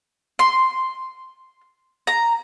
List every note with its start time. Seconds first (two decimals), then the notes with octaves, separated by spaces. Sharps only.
0.39 C6
2.07 A#5